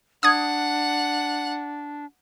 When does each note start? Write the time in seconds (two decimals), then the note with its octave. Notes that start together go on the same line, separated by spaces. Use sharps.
0.23 D4 F#5 D#6 G#6